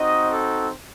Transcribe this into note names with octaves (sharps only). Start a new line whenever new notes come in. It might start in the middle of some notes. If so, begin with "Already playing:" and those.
Already playing: C4 D#4 F#4 D#5
A4